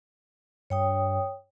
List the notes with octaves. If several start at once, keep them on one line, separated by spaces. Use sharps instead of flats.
G2 C#5 G5 D#6